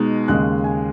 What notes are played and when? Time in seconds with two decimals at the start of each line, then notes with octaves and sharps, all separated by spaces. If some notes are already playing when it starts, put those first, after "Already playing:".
Already playing: B2 G#3 D#4
0.28 D#2 C#3 G#3 F#6
0.64 G#5